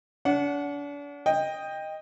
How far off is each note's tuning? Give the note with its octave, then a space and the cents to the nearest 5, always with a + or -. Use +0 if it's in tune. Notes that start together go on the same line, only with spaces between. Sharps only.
D4 -40 F#5 +0
D#5 +0 G5 +15